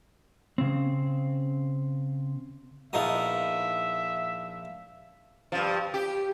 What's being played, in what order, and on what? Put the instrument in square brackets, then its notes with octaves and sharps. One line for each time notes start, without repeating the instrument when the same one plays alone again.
[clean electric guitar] C#3 C4
[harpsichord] A#1 F3 D#6 [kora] B3 D#4 E4 [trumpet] E5
[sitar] G2 F3
G4